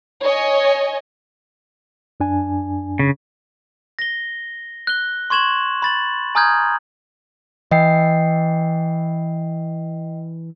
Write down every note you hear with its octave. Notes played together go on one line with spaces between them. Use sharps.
C#5 D#5 G#5
F#2 D4 G#5
C#3
A#6 G7
F#6 G7
C6 C#6 G#6 E7 F#7
B5 A6 F#7
G#5 A#5 D#6 F6 G6 G#6
E3 D#5 G5 C7